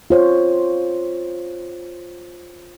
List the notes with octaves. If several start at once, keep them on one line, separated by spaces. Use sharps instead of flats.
F4 C5 C#5